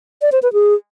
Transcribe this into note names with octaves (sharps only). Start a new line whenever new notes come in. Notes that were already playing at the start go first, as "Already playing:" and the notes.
D5
C5
B4
G#4